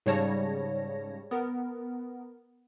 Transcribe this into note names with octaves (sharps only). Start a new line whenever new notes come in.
G#2 C#3 G3 C#5 A5 A#6
B3 A#4